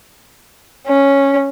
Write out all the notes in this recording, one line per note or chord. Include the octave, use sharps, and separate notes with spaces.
C#4